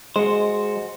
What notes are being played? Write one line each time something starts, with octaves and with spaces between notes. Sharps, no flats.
G#3 F#4 C5